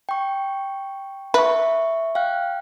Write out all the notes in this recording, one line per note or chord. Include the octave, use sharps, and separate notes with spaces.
G5 C#6
B4 E5 C#6
F5 G5 F#6